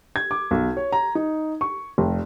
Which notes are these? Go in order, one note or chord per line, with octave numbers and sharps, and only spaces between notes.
G#6
D6
B1
C#5
A#5
D#4
C#6
F1